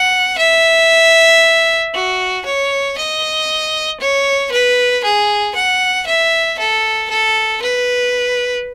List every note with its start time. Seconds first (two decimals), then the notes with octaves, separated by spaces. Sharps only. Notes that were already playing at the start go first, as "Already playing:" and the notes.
Already playing: F#5
0.39 E5
1.94 F#4
2.45 C#5
2.97 D#5
4.00 C#5
4.52 B4
5.04 G#4
5.55 F#5
6.07 E5
6.59 A4
7.10 A4
7.62 B4